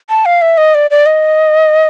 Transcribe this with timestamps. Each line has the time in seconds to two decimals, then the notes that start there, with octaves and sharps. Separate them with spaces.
0.10 A5
0.25 F5
0.42 E5
0.58 D#5
0.75 D5
0.91 D5
1.06 D#5